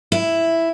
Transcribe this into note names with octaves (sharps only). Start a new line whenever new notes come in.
E4